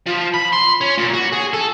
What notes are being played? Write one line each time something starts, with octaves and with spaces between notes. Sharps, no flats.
F3
B5
C6
C#4
A#2
F#4
G#4
A4